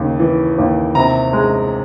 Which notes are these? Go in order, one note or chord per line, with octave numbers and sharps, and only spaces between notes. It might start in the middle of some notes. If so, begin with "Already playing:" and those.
Already playing: D#2 C#3
E3
D#2
C3 A#5
G#3